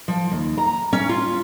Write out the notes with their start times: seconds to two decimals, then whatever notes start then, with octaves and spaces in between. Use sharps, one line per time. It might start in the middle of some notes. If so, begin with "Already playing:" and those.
0.08 F3
0.32 D#2
0.58 A#5
0.93 C#4
1.09 F4